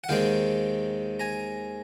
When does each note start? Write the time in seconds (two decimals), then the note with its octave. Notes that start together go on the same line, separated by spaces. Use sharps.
0.04 F#5
0.09 D#2 D#3 G#3 C4 F5 G5
1.20 G#5 A#5